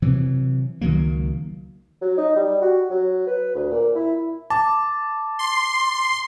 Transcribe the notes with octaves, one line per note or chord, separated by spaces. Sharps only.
C3 E3 F#3
C#2 D#3 F#3 A#3
F#3
D#4
G3
F#4
F#3
B4
D2
A#2
E4
A5 D6
C6